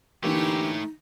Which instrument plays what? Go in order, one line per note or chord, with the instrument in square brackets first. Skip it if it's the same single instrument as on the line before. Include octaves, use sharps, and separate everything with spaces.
[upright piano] D3 E3 A#3 [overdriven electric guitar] A3 C#5 [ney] D#4 [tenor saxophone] G4